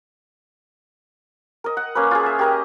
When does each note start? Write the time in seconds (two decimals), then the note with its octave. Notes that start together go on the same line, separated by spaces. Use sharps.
1.64 A#4 D#5
1.77 F#5
1.95 A#3 C#4 B4
2.11 F4 G#4
2.26 E5
2.39 G4 A#4 D#5